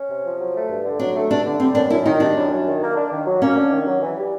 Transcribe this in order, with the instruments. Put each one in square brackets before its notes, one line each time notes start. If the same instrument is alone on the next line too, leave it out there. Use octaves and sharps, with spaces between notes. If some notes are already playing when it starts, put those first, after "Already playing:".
Already playing: [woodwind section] C#4
C3
F3
F#3
A3
G2
D3
[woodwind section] F#3 [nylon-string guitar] D4
[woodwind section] A3
[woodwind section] G2 [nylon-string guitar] D4
[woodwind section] D3
[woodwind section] G3 [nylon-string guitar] C4
[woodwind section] F#2 [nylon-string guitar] D4
[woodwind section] F#2 [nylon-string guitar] E4
[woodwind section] D#3 [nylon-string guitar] D#4
[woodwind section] G3 [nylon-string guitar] D4
[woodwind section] F#2
F#2
D#3
A#3
D4
D#3
F#3
[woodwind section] A#3 [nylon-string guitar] C#4
[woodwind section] D4
D#3
F#3
E3
G3